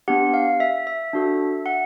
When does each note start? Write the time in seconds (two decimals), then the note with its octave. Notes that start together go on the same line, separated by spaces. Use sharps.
0.08 B3 D4 G4 F#5
0.34 F5
0.60 E5
0.87 E5
1.13 D4 F#4 A4
1.66 F#5